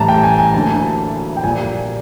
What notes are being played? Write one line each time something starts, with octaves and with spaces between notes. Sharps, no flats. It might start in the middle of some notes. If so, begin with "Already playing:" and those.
Already playing: A1 A2 E3 G3 A5 A#5
G5
G#5
G#5
D2 D3 F#3 A#3 A5
A5
G5
A#1 A#2 G3 A#3 G#5